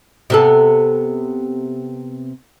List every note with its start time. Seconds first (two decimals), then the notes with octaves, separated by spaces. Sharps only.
0.30 C3 B3 A4